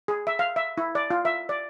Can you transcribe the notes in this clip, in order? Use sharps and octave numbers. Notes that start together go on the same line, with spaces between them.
G#4
E5
F5
E5
E4
D5
F4
E5
D5